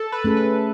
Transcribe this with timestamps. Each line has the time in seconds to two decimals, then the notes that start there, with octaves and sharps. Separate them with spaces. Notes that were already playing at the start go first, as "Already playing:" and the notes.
Already playing: A4
0.12 B4
0.24 A3 C#4 G#4
0.37 B4